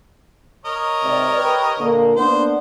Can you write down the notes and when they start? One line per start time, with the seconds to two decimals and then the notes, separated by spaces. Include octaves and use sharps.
0.65 A#4 C#5 D#5
1.03 G#2 C3 D5
1.36 G4 B4
1.79 A#2 D3 A#3
2.16 A#3 B3 D4 C5